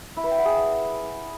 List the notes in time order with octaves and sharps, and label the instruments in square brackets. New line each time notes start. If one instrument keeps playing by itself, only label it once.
[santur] E4
B4
G5
F#5
G#4